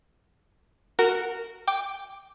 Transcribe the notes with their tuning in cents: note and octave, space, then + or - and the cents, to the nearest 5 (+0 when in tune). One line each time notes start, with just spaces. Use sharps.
F#4 +0 A#4 -15
G5 +0 D6 +0